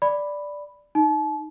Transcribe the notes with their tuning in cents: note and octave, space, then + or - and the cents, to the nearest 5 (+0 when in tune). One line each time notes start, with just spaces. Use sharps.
D5 +0 B5 +0
D#4 +0 A5 -40